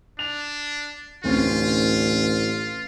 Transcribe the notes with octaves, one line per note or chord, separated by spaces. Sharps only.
D4 F7
A1 D2 C4 C#4 F4